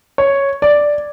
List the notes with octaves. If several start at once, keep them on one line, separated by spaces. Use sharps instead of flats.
C#5
D5